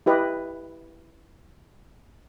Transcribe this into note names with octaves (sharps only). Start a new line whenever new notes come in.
E4 G4 B4 D#5